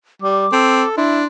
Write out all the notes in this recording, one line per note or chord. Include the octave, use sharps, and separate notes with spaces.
G3 D6
C4 A4
D4 E4 C6